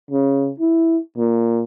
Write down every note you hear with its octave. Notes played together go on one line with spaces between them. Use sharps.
C#3
E4
A#2